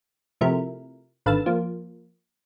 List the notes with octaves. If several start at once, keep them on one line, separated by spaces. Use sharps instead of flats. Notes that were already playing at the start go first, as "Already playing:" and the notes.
C3 F3 A3 E4 A#4
G#1 D3 B4 F5 E6 A6
F3 A#3